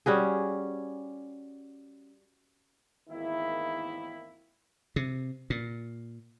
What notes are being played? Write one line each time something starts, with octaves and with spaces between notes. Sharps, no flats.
G3 C#4 F#4 G#4
G#1 E2 D#3 A#3 E4
C3
A#2